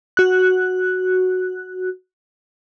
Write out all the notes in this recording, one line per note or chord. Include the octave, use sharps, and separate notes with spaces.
F#4 F#6